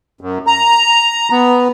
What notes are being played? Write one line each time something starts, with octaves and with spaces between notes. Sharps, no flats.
F#2
A#5
B3